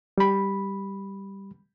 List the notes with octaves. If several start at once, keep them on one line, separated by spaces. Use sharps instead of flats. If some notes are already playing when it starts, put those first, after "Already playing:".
G3 B5